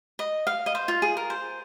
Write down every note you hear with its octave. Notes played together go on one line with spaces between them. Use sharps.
D#5
F5
D#5
C5
F4
G#4
A#4
C5